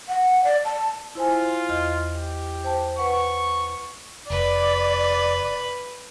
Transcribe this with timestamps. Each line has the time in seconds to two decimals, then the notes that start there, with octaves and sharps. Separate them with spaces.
0.08 F#5
0.44 D5
0.65 A5
1.15 E4 F4 C5 G#5
1.69 E2 D#5 F6
2.15 G4
2.64 C5 G5 A5
2.98 B4 F#5 C#6
4.30 F1 B4 D5